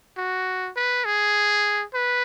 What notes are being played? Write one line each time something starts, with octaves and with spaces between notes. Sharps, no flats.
F#4
B4
G#4
B4